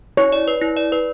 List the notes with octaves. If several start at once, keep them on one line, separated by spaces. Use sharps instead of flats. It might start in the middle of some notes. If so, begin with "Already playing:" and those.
E4 C#5
D5
B4
E4
D5
B4